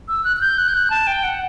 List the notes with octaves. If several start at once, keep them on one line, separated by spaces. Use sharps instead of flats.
E6
F#6
F#6
G6
F#6
G6
F#6
A5
G5
F#5